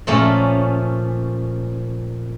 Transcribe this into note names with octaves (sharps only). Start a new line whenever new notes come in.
A#2 F3 A3 C#4